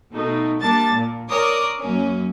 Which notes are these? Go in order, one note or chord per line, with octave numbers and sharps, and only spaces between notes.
B2 A3 D#4
G3 A#3 D4 A5 A6
A#2
A#4 C#5 D5 D6 D#6
F#2 A#3 C#4